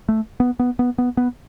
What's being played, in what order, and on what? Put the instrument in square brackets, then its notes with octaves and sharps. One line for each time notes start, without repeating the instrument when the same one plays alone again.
[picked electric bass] A3
B3
B3
B3
B3
B3